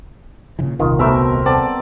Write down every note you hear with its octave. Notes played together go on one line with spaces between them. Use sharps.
A#2 C#3 E3
D#1 C2 C3 D#3 F4
B2 A3 C4 A#4 E5
B3 C4 A4 D5